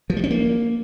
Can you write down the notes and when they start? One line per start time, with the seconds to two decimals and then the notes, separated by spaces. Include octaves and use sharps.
0.10 F3
0.17 G3
0.24 C#4
0.31 A#3